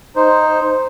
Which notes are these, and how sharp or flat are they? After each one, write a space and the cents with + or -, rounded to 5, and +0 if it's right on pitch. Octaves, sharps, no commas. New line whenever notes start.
D#4 +0 C5 +0